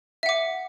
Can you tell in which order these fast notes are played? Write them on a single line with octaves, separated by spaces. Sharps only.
E5 F#5 D6